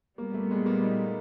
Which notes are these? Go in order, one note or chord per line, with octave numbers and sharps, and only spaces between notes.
A#2 G3 A#3 B3
A3
G#3
A#3
D#4